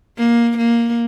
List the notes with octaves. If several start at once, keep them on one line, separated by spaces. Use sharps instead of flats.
A#3
A#3